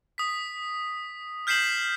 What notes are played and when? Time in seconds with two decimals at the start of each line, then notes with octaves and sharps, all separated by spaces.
0.18 D#6 B6
1.47 F6 G6 B6 C7 E7 F#7